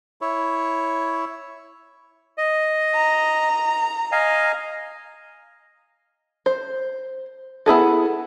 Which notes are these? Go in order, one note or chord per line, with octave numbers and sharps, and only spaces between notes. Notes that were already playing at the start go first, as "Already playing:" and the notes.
E4 C#5
D#5
A#5
D#5 F5 G#5
C5
B3 E4 G#4 A4